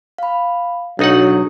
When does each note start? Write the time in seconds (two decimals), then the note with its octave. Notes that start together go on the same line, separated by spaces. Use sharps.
0.18 F5 B5
0.99 B1 F#3 D4 D#4 F#5 D#6